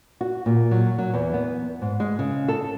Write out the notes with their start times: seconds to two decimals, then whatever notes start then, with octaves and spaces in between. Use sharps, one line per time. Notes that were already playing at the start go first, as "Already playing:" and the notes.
0.21 F#4
0.46 A#2
0.71 F#3
0.98 F#3
1.14 E2
1.34 B3
1.82 G#2
2.00 G#3
2.19 C#3
2.48 A4